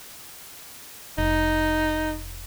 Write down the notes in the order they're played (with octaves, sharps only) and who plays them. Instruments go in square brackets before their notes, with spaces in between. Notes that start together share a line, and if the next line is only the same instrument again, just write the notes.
[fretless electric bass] F1 [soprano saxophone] D#4